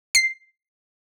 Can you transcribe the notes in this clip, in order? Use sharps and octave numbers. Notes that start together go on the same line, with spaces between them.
C7